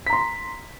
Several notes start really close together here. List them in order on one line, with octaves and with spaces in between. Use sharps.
B6 A#5 C6